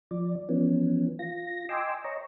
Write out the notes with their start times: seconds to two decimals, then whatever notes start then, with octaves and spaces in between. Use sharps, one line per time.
0.11 F3 D5
0.49 E3 F3 B3 C#4
1.19 F4 A#6
1.69 D#5 G5 G#5 C6 D6 E6
2.04 C#5 D#5 A#5 C#6